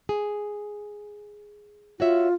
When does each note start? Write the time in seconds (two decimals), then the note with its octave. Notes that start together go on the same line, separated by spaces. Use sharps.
0.09 G#4
2.00 F4 F#4 C#5 E5